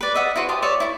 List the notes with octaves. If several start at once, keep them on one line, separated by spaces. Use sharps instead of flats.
B4 D5
D#5 E5 F#5
E4 F#4 B4 C5
G4 A5 C6 D#6
C#5 D5 E5
E4 C#6